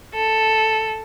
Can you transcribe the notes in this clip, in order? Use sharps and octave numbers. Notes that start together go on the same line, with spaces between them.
A4